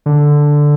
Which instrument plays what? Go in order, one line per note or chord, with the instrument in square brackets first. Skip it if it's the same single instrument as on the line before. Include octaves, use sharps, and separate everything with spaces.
[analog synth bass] D3